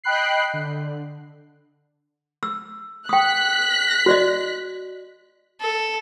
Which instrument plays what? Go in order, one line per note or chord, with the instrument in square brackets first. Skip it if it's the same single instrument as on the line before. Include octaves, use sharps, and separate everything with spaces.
[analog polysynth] D#5 G5 B5 F#6 C7
D3
[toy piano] E6
[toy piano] G5 D#6 [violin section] F#6 B6
[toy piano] F#4 D5 D#5
[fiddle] A4